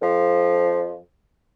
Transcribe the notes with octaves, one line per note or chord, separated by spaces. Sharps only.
F2 F3